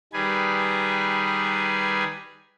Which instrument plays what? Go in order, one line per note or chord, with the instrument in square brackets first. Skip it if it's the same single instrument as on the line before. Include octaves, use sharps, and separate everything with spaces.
[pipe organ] D#3 G3 G#4 B4 G#5